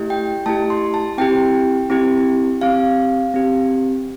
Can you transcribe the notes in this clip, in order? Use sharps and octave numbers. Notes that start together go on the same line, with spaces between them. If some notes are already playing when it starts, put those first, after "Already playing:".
Already playing: A3 E4 G4
G5
A3 E4 G4 A5
C6
A5
C4 E4 G4 G5
C4 E4 G4
C4 G4 F5
C4 G4